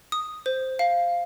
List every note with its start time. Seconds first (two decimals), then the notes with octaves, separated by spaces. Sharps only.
0.12 D#6
0.46 C5
0.79 F5